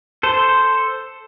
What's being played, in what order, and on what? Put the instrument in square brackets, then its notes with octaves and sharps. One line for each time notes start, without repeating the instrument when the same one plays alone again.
[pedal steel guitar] A4 C5